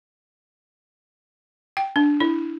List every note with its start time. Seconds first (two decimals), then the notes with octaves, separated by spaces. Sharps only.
1.77 G5
1.96 D4
2.20 E4